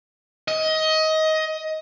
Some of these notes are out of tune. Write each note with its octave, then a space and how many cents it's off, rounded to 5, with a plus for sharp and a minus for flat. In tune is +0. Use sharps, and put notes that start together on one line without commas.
D#5 +20